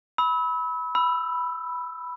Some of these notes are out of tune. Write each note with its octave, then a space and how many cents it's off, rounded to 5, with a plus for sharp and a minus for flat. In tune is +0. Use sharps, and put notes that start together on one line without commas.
B5 -5 E6 -35
B5 +0 E6 +15